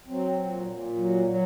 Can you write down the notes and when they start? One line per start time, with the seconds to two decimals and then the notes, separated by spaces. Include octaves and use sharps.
0.08 F#3 C4
0.39 A#2
0.67 A#2
0.96 F#3
1.25 F#3